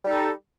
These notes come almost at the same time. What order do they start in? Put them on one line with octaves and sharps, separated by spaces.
G3 D#4 A4